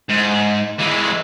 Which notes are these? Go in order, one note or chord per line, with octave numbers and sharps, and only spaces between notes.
G#2
E3 G#3